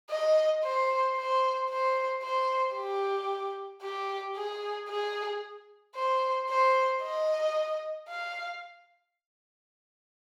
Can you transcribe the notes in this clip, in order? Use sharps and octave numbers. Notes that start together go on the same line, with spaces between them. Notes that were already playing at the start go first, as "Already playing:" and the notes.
D#5
C5
C5
C5
C5
G4
G4
G#4
G#4
C5
C5
D#5
F5